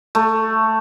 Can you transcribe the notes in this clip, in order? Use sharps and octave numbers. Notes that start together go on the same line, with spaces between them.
A3